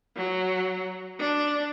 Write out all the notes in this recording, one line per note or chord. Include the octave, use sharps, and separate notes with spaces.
F#3
D4